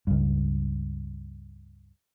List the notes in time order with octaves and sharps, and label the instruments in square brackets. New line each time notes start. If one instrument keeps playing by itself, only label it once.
[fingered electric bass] C#2 G2